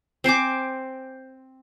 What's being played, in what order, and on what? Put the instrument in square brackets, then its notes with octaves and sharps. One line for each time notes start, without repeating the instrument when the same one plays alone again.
[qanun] C4 C5 G#5 D6